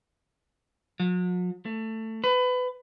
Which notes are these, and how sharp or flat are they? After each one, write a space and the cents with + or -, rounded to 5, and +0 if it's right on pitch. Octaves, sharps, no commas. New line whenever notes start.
F#3 -45
A3 +15
B4 +25